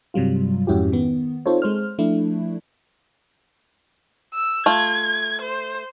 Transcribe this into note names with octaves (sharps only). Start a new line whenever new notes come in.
G2 C3 F#3 G3 F4
F2 G#2 C#4 E4 F#4 G4
D#3 B3
C4 D#4 F4 A4 C5 C#5
G#3 C5 F6
F3 A3 D4 E4
E6
A3 F4 G#6
C5